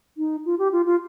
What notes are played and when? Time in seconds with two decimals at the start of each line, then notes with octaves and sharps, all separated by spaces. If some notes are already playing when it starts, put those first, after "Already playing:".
0.17 D#4
0.46 F4
0.59 G4
0.72 F4
0.86 F4